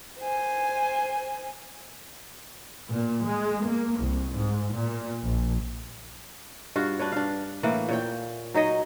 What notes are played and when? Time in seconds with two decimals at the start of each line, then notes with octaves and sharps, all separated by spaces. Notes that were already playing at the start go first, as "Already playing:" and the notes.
0.19 C5 G#5
2.89 A#2
3.23 G#3
3.63 A#3
3.98 C2
4.33 G#2
4.72 A#2
5.22 A#1
6.76 G2 F4 F#4
6.99 D4 B4 C#5
7.12 D4 F5
7.63 A2 E3 A#3 F#5
7.89 A#2 C#5 G5
8.54 F#3 D#4 C#5 D#5